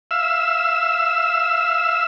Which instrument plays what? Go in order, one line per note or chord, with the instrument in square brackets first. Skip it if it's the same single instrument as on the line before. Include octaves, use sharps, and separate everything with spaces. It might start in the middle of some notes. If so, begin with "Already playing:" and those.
[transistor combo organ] E5 F5 E6